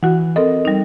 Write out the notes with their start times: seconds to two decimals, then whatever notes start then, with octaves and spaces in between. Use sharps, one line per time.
0.03 E3 F#4 F#5
0.36 C4 A4 A#4 D#5
0.65 G3 D#4